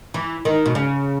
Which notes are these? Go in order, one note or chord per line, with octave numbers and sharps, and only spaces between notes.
E3
D#3
B2
C#3